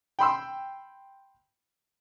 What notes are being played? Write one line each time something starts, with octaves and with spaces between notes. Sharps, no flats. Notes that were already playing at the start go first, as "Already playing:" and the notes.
G5 B5 C6 E6